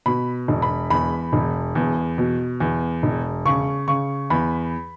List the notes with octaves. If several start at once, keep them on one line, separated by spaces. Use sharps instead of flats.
B2 B5
E1
B5
E2 B5
E1
E2
B2
E2
E1
C#3 C#6
C#3 C#6
E2 B5